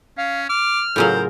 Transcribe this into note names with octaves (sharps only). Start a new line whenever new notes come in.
C#4 F5
D6 F6
A2 C#3 F#3 F4 G#4 A#4 C5